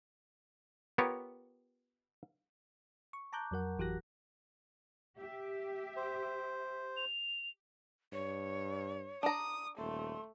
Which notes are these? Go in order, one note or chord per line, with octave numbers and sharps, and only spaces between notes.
B3 F4 G4 A#4 C#5
C#6
A5 A#5 D6 F#6 G6
F2 F#3 A#4 F#5
G#1 E3 F#4 G4 F#6 A#6
G4 E5
C5
F7
G2 C#5
D4 A#5 D#6
D#1 A3 C6